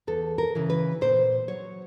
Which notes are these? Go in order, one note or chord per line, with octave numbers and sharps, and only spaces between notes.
E2 A4
A#4
C#3 E3
B4
A#2 C5
F#3 C#5